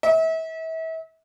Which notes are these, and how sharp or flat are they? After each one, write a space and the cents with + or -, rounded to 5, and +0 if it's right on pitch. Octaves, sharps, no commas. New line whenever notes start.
E5 -35